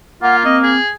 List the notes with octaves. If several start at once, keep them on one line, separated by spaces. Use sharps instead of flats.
A#3 F4 F#5
C4 D#5
G#4